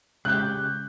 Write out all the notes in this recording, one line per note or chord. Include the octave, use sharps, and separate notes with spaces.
C#3 G#3 G4 F#6 G6